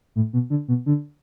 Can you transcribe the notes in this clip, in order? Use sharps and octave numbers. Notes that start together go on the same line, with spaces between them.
A2
B2
D3
B2
D3